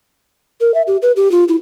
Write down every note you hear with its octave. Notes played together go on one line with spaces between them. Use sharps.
A#4
E5
G4
B4
G4
F4
E4